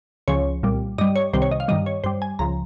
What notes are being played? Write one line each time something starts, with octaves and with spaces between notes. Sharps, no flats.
C#2 C#3 F3 C#5
C2 A#2 G3
G2 G3 D#5
C#5
C2 C3 D#3 G3 C5
C#5
D#5
F5
G2 D#3 G3 D#5
C#5
G2 G3 C5
G#5
C#2 C#3 F3 A#5